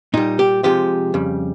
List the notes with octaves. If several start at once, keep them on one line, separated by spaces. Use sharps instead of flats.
A#2 G3 D#4
G4
C3 F3 G#3 G4
F2 C#3 G3